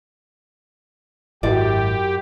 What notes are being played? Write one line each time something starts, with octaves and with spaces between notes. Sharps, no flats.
G#1 F#2 E4 F#4 G4 D5